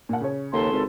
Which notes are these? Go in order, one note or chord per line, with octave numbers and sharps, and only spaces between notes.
A#2 F#5
C#3 C#5
D#2 A4 B4 C6
G#1